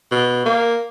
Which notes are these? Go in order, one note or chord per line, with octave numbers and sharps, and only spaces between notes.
B2
A#3